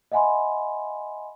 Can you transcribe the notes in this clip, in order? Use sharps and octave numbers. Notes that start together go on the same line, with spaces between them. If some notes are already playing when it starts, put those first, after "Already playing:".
D#5 E5 F#5 G#5 B5 C6